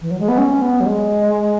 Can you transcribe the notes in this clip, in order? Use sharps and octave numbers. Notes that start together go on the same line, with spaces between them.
E3
F#3
G#3
B3
C#4
B3
F#3
G#3